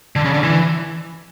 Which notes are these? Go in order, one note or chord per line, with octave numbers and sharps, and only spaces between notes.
D3
C#3
D3
E3